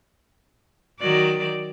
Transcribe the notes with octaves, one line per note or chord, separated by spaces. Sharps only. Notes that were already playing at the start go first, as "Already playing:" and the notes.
D#3 F#3 D5